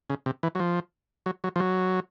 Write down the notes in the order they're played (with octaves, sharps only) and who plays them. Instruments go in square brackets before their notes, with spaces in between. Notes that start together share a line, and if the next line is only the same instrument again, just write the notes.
[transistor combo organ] C#3
C3
E3
F#3
F3
F#3
F#3
F3
F#3